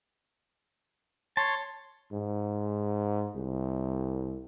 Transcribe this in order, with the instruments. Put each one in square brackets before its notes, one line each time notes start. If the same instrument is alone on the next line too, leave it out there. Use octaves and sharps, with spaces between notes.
[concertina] C#5 C6 [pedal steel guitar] A5
[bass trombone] G#2
C2